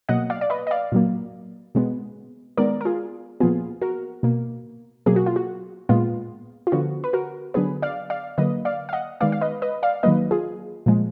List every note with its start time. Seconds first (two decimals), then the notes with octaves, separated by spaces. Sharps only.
0.09 B2 F#3 A#3 D#5 F#5
0.30 D5 F5
0.41 D5
0.50 B4 D#5
0.67 D#5
0.71 D5 F5
0.92 A#2 F#3 A#3
1.75 B2 G#3 B3
2.57 D#3 G#3 B3 A#4 D5
2.81 A#4
2.85 F4 G#4
3.40 A#2 F3 B3 F4 G#4
3.82 F#4 A#4
4.23 B2 A#3
5.06 B2 F#3 A#3 G#4
5.16 F#4
5.26 F4
5.36 F#4
5.89 A#2 G#3 B3 F4
6.67 F4
6.72 D3 F3 B3 F#4
7.04 B4
7.13 F#4 A#4
7.54 D3 F#3 B3 G#4 B4
7.82 D5 F5
8.10 D5 F5
8.38 D3 F#3 A#3 B4 D#5
8.65 D5 F5
8.89 F5
8.93 D#5 F#5
9.21 D#3 G#3 B3 D5 F5
9.32 F5
9.41 B4 D#5
9.62 B4 D#5
9.83 D5 F5
10.03 D#3 F#3 A#3 B4 D#5
10.31 F4 G#4
10.86 A#2 F3 G#3